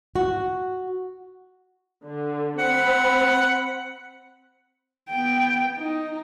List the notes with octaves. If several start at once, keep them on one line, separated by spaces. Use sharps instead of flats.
F#4
D3
C4 F#5 B5
B3 G5
D#4